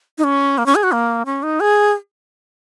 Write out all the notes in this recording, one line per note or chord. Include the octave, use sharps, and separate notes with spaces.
D#4
C#4
A#3
C#4
G#4
F#4
A#3
C#4
D#4
G#4